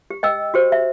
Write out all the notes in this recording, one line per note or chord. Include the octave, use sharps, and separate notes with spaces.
G4
D#5 G5 E6
F#4 G4 C5
E5